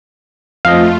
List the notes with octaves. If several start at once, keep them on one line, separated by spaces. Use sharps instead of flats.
F2 F3 A3 F4 D#5 F5